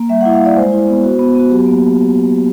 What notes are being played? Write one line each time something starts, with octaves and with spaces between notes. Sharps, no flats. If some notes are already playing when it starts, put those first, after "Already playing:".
Already playing: A#3
G3 E5
F#5
E4
F5
E4 D5
G#3 C5
E4
B3
F#4
B3
B3 F#4
F#3 G4
A#3